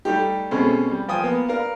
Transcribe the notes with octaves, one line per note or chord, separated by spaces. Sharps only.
G3 A3 D#4 G4
B2 G#3 A3 C4 C#4
G3
F3 G5 G#5 D#6
A#3 B3
A#4 B4 D5 F5